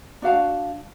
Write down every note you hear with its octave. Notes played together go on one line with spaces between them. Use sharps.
D4 F#4 F5 A5